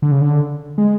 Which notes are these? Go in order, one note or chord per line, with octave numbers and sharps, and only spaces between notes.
D3
C#3
D3
G#3